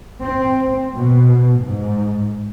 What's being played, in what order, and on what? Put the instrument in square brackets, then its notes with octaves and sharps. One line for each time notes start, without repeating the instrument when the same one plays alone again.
[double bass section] C4
B2
G#2